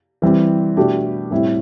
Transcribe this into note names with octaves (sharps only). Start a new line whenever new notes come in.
E3 G3 C4
B2 A3 D4 G4
A2 G3 C4 E4 G4